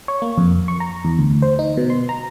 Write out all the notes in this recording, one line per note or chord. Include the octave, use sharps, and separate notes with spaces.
C#5
A#3
F2
C#6
A#5
E2
D2
C5
D#4
B2
C6
A#5